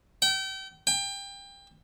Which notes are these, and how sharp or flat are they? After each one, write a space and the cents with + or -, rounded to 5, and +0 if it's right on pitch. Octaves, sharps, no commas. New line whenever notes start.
G5 -35
G5 +25